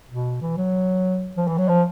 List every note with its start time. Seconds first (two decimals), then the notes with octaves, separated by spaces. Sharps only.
0.09 B2
0.41 E3
0.57 F#3
1.37 F3
1.47 E3
1.58 F#3
1.68 F3